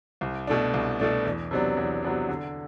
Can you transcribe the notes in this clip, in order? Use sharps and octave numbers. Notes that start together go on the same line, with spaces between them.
C2
B2 A3 D4
C2
B2 A3 D4
E2
C3 F#3 B3 D4
E2
C3 F#3 B3 D4
D3